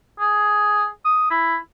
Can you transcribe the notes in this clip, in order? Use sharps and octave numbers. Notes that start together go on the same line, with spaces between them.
G#4
D#6
E4